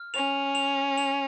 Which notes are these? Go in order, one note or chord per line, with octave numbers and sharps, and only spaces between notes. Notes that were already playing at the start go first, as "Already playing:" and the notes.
Already playing: F6
C#4 F7
F7
F7